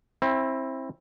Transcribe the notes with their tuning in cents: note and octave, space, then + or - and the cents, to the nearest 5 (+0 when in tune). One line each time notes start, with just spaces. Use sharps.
C4 +25 E4 +0